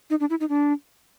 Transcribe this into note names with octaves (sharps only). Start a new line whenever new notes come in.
D#4
D4
E4
D#4
D4